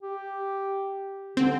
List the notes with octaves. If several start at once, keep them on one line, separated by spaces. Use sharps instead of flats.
G4
D3 C4